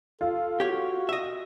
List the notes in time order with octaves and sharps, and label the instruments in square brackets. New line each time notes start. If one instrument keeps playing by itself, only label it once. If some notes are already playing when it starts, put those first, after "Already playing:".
[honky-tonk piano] F4 [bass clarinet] A4
[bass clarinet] F#4 [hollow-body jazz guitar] G4 C#5
[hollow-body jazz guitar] D#5 E5